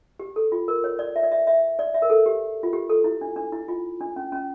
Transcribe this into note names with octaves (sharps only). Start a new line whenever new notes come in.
G4
A4
F4
A#4
C#5
D5
E5
D5
E5
E5
D5
E5
A#4
A4
G4
F4
G4
A4
E4
D4
D4
E4
F4
D4
C#4
C#4